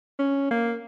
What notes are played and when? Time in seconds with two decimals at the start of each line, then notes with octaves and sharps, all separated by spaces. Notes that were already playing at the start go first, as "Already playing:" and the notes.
0.19 C#4
0.51 A#3